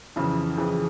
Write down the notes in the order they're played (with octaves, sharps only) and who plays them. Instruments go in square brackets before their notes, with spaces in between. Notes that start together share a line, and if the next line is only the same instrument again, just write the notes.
[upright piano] F2 C#3 E3 [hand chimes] E4
[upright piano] F2 C#3 E3 [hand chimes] G#4